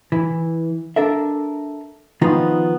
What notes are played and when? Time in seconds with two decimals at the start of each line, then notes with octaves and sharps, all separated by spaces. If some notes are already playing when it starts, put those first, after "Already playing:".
0.12 E3
0.96 D4 A4 A#4 E5
2.21 D#3 F3 B3 D#4 F4